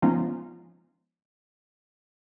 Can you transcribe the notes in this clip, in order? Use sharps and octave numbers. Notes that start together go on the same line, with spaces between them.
F3 G#3 B3 C#4 D#4 F4